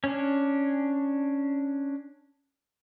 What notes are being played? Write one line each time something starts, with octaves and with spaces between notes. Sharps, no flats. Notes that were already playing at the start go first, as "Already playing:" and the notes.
C#4 D4